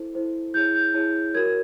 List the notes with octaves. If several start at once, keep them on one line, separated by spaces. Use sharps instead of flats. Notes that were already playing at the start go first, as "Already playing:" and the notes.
Already playing: E4 A4 C5
E4 A4 C5
E4 G#4 C#5 G6
G6
E4 G#4 C#5
F#4 A#4 C#5 G#6
G#6